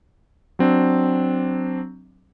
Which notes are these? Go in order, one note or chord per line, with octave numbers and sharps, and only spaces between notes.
F#3 C4 D4